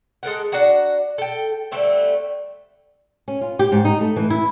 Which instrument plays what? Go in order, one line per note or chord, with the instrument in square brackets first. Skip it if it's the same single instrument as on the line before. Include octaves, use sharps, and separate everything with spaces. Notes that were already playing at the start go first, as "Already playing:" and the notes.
[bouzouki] G#3 A4 A#4 F#5
D4 F#4 F#5 A#5
A4 G5
D3 G3 A3 C4
[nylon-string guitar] C#4
F4
G4
G#2
D#4
A3
E3
E4